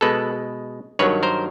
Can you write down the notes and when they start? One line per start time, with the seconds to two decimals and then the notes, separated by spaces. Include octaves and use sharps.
0.01 B2 G#3 A4 B4
0.99 G2 D#3 F#3 B4 C#5
1.23 A#4 C5